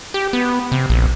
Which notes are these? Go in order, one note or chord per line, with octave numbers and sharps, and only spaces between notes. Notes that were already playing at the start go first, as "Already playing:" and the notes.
G4
B3
C3
A#1